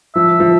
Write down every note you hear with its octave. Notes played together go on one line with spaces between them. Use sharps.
F3 E5
F3